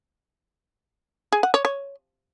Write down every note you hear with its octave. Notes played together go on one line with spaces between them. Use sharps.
G#4
F#5
C#5
C#5